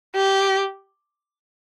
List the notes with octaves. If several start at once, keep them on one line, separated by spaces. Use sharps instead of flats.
G4